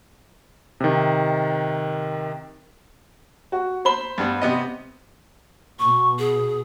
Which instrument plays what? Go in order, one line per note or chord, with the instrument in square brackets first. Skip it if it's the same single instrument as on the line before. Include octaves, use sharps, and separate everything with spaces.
[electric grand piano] C3 D#3
[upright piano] F#4
C5 B5 G7
[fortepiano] G2 G3 B3
C3 B3 D#5
[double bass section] B2 [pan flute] C#6
[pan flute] G#4